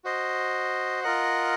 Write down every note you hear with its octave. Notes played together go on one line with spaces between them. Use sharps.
F#4 C5 D#5
F4 A#4 D#5 F#5